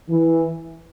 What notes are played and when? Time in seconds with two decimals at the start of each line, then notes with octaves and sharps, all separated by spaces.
0.09 E3